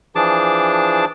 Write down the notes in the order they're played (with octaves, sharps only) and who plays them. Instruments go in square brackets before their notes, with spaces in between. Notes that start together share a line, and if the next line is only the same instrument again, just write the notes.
[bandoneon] E3 F3 D4 G#4 A5 D6